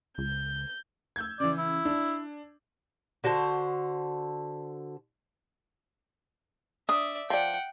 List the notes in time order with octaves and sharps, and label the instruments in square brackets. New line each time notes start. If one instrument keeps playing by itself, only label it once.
[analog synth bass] C#2 [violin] G6
[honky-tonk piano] E6 G6 G#6
[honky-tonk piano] C#3 E3 [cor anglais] D5
[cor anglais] E4
[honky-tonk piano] D4
[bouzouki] D3 F#4 C5 A5
[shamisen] D4 [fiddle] D5 E5 [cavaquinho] D#6
[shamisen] F3 D5 [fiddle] F#5 G5